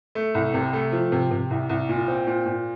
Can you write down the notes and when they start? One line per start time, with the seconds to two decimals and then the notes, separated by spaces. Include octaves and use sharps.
0.15 A3
0.35 C2
0.54 C3
0.73 A3
0.92 F3
1.12 C3
1.31 C3
1.51 C2
1.70 C2
1.89 A#2
2.08 C4
2.27 A#2
2.46 A#2